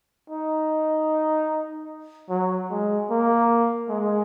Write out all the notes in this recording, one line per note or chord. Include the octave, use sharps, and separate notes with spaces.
D#4
F#3
G#3
A#3
G#3